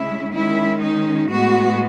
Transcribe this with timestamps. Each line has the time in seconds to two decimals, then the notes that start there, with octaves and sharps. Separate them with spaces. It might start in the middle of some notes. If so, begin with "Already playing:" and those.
Already playing: C#3 G#3 C#4 E4
0.34 D#3 G#3 C#4 E4
0.81 D#4
1.30 A2 G#3 B3 F#4